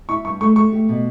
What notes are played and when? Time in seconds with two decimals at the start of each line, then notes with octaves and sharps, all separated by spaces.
0.09 E4 C#6
0.25 G2 C#6
0.41 A3 C#6
0.56 A3 C#6
0.72 G4
0.89 B2